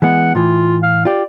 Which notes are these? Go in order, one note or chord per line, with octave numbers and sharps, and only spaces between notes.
E3 G#3 B3 F#5
A2 E3 F4
F5
F4 G4 D5